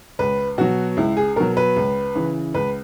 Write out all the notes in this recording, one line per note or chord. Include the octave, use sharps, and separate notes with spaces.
C#2 B4
B2 F#3 F#4
C#2 E4
G#4
B2 F#3 A#4
B4
C#2
C#3 E3
C#2 B4